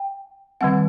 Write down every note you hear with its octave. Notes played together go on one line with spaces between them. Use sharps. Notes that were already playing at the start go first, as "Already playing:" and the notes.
Already playing: G5
D#3 G3 C4 F#5